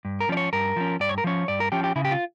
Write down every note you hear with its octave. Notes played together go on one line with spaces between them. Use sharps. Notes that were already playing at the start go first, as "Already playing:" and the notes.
G2
A#4
F3 C#4 D5
C#5
G2 A#4
F3 C#4
G2 D5
C#5
A#4
F3 C#4 C#5
G2 D5
A#4
F3 C#4 G4
G4
C#3 E4
G4
F4